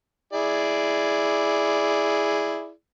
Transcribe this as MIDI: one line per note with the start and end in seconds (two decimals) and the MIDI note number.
0.33 2.70 64
0.33 2.70 68
0.33 2.70 74